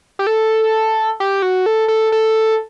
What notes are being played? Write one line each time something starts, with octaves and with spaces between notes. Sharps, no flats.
G4
A4
G4
F#4
A4
A4
A4